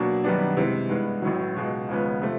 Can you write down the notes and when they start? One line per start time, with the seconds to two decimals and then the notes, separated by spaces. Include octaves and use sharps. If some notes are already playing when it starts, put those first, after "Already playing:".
Already playing: B2 F#3 A#3 D4
0.24 F#2 D#3 G3 B3 D4
0.57 C3 E3 G#3 C4
0.89 G2 E3 G#3 B3
1.22 A1 A2 F#3
1.56 C#2 B2 G#3
1.88 D#2 C#3 F3 G#3 B3
2.22 C3 F3 A3